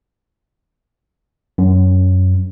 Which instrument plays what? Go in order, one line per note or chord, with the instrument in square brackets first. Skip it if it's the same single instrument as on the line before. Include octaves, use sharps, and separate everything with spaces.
[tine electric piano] F#2